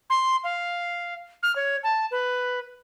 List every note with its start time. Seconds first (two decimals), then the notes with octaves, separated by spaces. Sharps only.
0.10 C6
0.44 F5
1.43 F6
1.56 C#5
1.84 A5
2.11 B4